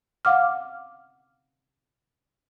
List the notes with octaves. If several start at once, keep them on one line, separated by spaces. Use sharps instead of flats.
F5 F#5 D6 F6